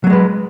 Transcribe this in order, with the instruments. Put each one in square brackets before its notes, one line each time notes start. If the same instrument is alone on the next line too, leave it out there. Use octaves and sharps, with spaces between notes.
[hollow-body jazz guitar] F#3
A#3
G#3
B4